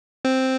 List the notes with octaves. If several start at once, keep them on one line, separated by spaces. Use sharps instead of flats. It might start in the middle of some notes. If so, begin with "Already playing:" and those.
C4